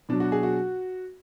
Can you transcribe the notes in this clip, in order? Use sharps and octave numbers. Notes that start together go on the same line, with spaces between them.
B2 F#3 D4
F#4
G#4
F#4